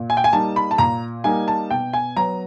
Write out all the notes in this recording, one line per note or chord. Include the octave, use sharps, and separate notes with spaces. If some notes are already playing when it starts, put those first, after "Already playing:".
Already playing: A#2
G#5
G5
G#5
G3 A#3 D#4 A5
B5
A5
A#2 A#5
G3 A#3 D#4 G#5
A5
B2 G5
G#5
F#3 B3 A#5